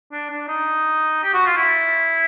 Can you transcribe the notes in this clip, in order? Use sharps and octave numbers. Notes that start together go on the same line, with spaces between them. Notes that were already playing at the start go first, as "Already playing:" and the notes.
D4
D4
D#4
G4
F#4
F4
E4